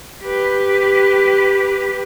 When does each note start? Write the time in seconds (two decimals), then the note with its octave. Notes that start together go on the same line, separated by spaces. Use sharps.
0.24 G4 B4